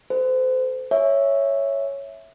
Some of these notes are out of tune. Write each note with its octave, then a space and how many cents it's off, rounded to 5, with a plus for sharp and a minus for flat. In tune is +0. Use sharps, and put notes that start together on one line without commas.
A4 +0 C5 -30
C#5 +0 E5 +0 G#5 +0